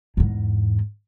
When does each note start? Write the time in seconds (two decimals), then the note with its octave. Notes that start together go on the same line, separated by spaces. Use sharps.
0.17 E2 G#2